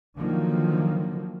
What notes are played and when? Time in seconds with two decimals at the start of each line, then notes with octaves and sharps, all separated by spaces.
0.18 D3 D#3 F3 F#3 A#3